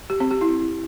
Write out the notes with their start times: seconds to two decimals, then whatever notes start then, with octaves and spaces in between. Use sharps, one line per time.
0.10 G4
0.20 C4
0.31 G4
0.41 E4